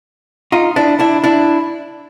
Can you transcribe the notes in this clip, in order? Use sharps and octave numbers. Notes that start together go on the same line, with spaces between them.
D#4 F4
D4 E4
D4 E4
D4 E4